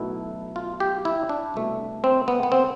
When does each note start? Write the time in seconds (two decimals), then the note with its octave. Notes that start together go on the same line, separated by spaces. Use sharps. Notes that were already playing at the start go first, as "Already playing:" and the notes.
Already playing: B1 B2 A3 E4
0.56 F4
0.80 G4
1.05 E4
1.29 D4
1.54 C2 B2 A3
2.04 C4
2.28 B3
2.43 B3
2.52 C4